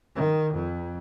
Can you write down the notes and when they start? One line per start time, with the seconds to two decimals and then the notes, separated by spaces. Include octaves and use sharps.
0.15 D#3
0.54 F2